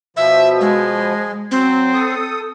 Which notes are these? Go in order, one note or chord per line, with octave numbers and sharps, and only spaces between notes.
B2 F3 E5
G#3
F#3 C4
A4 D#6